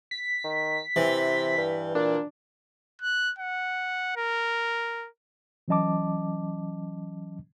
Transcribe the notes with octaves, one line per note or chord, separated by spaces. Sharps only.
B6
D#3
C3 E3
G2
A#2 D4
F#6
F#5
A#4
E3 F#3 C#4 D#5 A5 D6